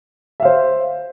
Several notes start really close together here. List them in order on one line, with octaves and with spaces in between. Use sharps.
E5 F5 C5